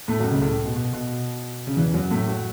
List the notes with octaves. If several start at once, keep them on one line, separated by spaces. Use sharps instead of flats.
A2 A3
F#2 F#3
C#2 C#3
A2
B2
B2
B2
C#3
E2 E3
F#2 F#3
A2 A3
F#3